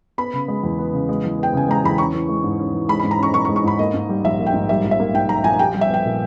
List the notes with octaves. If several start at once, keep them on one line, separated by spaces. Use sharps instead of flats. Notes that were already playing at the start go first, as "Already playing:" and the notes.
B3 B5
C#3
G#3
E2
B3
C#3
G#3
E2
B3 G5
C#3 G#5
G#3 A#5
E2 B5
C#4 C#6
E3
G#3
G#2
C#4
E3
G#3 B5
G#2 B5
A#5
C#4 C#6
E3 C#6
C#6
G#3
C#6
G#2 B5
A#3 D#5
G#2
G3
A#1 E5
A#3
G5
G#2
G3 E5
A#1
E5
A#3
G#2 G5
G3 A#5
A#1 G#5
G4 G5
G3
E5
B3 G5
A#2